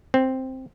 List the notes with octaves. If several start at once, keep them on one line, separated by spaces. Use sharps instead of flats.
C4